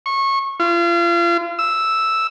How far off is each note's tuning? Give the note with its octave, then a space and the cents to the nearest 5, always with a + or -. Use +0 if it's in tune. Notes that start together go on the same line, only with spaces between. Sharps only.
C#6 -25
F4 -35
E6 -5